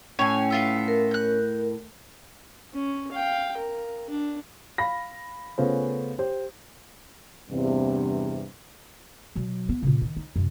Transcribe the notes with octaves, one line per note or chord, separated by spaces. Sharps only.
A2 C#4 C#5 G#5
B3 F4 E5
A#4
F#6 G6
C#4
F5 G5
A#4
D4
F5 B5 A#6
C#3 A3 B3 C#4 F4 C5
G4 C5
E2 G2 C3
B2 F#3
B3
A#2 C#3
D#3 D4
D#4
F#2 C3